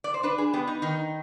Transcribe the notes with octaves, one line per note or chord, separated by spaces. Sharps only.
D5
C5
D4 B4
G#4
B3 G4
D#4
D#3 D#4